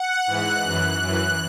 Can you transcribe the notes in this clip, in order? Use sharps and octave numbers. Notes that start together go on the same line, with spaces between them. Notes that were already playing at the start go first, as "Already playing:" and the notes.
Already playing: F#5
G#2 E3 F#6
F#2 E3
F#2 E3 F#6